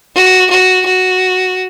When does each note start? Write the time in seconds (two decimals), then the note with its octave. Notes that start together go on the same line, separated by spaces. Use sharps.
0.16 F#4
0.50 F#4
0.86 F#4